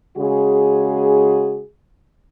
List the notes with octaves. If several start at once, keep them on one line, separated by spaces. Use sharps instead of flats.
C#3 G#3 F#4 G#4